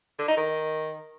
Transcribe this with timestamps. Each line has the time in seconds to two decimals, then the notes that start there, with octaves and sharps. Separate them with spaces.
0.19 D3
0.28 D#4
0.37 D#3